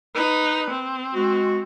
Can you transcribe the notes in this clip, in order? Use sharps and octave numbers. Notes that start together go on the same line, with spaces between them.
D#4 B4
C4
G#3 F#4